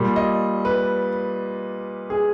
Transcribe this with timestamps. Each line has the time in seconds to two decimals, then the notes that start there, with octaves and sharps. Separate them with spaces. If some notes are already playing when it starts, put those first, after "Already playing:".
Already playing: A#2 G3
0.16 D#5
0.65 B4
2.10 G#4